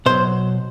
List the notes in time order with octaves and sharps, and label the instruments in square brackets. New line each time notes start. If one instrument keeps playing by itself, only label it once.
[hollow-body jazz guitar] B2 F#3 C5